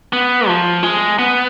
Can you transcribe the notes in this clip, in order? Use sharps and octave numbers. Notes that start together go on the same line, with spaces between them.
B3
F3
G#3
B3